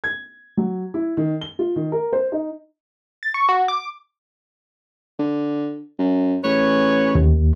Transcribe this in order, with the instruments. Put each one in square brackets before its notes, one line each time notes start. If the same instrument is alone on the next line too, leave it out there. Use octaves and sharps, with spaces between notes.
[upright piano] G#6
F#3
E4
D#3
G7
F4
D#3
A#4
C5
D#4
[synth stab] A6
C#6
F#4
D6
[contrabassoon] D3
F#2
[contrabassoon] A1 [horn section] G#4 B4 C#5
[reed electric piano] D#2